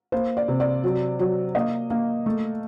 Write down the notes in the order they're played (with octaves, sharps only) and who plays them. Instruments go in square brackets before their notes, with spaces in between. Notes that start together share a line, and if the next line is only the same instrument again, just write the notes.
[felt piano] A#3 C5
D5
C3
D5
F#3
F#3
A#3 D#5
A#3
A3